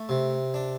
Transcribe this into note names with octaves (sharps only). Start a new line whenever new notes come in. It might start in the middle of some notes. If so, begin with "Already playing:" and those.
Already playing: A3
C3
D4